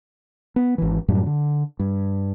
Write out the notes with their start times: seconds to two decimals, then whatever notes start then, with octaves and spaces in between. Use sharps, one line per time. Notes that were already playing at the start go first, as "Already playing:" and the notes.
0.56 B3
0.78 G#1 E3
1.08 F#2 A2 F#3 G3
1.26 D3
1.79 G2